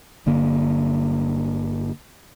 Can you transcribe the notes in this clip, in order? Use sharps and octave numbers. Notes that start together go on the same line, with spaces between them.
G1 D3 A#3